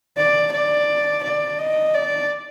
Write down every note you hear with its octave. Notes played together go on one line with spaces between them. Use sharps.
D5
D5
D5
D#5
D5